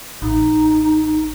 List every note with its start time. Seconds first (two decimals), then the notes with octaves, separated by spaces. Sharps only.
0.22 A1 D#4